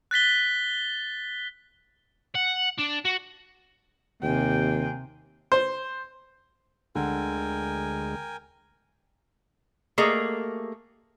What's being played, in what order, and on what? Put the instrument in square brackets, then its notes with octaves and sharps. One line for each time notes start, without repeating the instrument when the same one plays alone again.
[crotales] F#6 A6 B6 G7
[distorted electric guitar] F#5
D4
F#4
[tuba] D#2 [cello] C3 [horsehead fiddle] G5 G#5
[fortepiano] C5
[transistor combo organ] D2 G#3 [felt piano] D3 [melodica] A#4 G5 G#5
[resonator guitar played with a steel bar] A3 A#3 G4 G#4 D#5 A#5